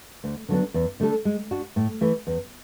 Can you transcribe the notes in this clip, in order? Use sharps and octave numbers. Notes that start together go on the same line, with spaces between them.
D2
D3 F#3 B3 D4
E2
D3 A3 D4 A4
G#3
D4 F#4
A2
E3 A3
E2